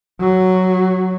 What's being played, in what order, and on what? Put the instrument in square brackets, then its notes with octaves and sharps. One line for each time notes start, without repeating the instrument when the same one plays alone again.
[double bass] F#3